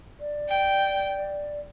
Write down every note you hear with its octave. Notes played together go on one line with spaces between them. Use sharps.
D5
G5